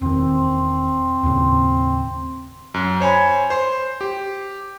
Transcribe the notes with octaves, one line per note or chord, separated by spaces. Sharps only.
E1 D#3 C4
D#2 A2 C#3
F#2
C5 C#5 G#5 B5
C5 C6
G4